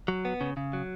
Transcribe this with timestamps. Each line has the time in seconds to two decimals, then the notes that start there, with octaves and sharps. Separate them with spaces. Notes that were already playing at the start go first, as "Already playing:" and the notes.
0.08 F#3
0.25 B3
0.41 C#3
0.57 C#3
0.73 F#3